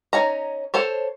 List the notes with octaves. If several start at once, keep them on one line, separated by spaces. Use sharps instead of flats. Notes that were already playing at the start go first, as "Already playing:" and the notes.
C#4 D#4 A#5
A4 C5 C#5